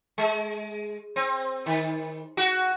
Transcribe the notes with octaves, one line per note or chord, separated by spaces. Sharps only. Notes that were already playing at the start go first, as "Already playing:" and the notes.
G#3
C4
D#3
F#4